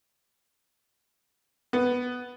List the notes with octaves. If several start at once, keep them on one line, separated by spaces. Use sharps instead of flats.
B3